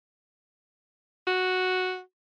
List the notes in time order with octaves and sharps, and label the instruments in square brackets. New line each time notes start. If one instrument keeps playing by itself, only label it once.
[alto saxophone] F#4